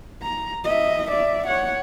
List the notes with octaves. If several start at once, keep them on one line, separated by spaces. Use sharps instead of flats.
A#5
D#5 E5
D5 E5
C#5 F#5